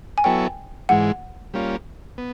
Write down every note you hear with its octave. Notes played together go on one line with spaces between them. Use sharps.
G#5
F#3 B3 E4 A4 C#5 G5
G#2 E3 G#3 F#5
G3 A#3 C#4 F4
B3